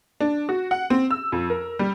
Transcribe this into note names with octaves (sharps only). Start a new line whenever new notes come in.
D4
F#4
F#5
C4
E6
F2
A#4
G3